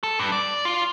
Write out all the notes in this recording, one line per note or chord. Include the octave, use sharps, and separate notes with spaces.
A4
G2
D5
F4